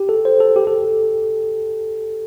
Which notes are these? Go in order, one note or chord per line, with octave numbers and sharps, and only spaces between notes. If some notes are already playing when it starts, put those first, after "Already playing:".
Already playing: G4
A4
C5
A4
G4
A4